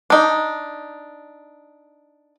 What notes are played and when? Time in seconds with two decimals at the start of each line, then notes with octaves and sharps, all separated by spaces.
0.10 D4 D#4